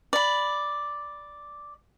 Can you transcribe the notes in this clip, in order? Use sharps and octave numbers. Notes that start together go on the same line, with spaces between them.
D5 B5